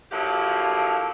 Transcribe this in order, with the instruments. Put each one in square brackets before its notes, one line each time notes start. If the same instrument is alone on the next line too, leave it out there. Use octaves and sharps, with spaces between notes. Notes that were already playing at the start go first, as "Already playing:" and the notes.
[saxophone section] D3 F3 F#3 A#3 E4 G4